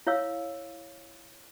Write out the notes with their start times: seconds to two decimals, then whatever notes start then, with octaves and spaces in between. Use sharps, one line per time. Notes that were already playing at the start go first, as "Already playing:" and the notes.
0.07 E4 C#5 F5 E6